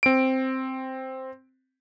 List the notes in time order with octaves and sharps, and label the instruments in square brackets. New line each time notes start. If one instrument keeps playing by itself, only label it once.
[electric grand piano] C4 D7